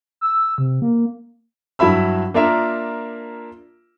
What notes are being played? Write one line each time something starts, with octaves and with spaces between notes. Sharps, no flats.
E6
C3
A#3
G2 F#3 E4 E5 B5 E6
A#3 D4 F4 A#4 E5